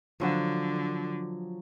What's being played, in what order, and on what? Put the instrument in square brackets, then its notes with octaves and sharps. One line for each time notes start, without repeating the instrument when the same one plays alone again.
[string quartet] D3 [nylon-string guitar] F3 F#3 F#5